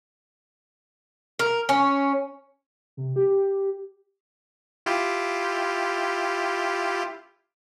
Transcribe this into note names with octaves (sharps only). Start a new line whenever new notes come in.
A#4
C#4
C3
G4
E4 F4 G4